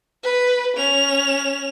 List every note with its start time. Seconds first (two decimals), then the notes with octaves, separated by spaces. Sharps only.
0.24 B4
0.77 C#4 F7